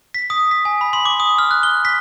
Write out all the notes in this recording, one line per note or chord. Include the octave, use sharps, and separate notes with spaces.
B6
D#6
B6
G#5
B5
C6
D6
D#6
F6
F#6
G7
B6